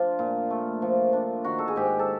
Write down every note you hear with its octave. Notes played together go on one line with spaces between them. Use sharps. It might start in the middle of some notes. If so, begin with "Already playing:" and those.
Already playing: F3 D4 F4
A#2
A3
F3
D4
D#3 F#4
A4
G#4
G#2 G4
A4